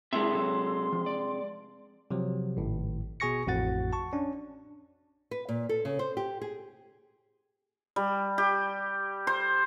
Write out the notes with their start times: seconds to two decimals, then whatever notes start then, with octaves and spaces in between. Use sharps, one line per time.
0.13 C3 G#3 D4 E4 E5 C6
0.33 F#3 A4
0.93 F3
1.06 D5
2.11 C3 F3 F#3
2.57 G#1 A2
3.20 B2 G#4 G#5 C#6 A#6 C#7
3.47 A1 F2 A2 F#4 F#5 A6
3.93 A5 C#6
4.13 C#4 D4
5.31 B4
5.49 A#2
5.69 A4
5.85 C#3
5.99 C5
6.17 G4
6.41 G#4
7.96 G3
8.38 G4
9.27 C5